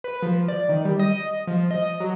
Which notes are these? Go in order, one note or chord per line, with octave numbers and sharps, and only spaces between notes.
B4
F3
D5
D#3
G3
D#5
F3
D#5
F#3